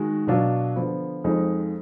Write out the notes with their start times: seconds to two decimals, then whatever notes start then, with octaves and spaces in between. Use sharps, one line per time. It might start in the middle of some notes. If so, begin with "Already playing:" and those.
Already playing: D#3 G#3 F#4
0.27 B2 F#3 D4 F4
0.76 D3 F3 B3
1.24 F2 F3 G#3 D#4